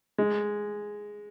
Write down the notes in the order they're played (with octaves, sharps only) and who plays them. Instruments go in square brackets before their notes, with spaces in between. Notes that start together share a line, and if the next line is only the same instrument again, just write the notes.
[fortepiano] G#3